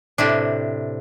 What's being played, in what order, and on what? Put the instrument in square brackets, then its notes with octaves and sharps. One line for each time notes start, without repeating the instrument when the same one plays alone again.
[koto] A2 C3 D4